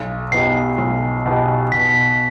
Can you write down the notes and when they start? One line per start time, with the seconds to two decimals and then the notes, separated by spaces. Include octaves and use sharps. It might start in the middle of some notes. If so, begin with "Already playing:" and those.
Already playing: B1
0.32 B2 B3 D#4 G4 C7
0.78 B1
1.25 B2 B3 D#4 G4
1.72 B2 B6